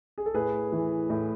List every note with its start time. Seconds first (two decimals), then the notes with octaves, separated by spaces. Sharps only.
0.18 G#4
0.26 A4
0.34 A2 G#4 B4
0.72 E3
1.10 A2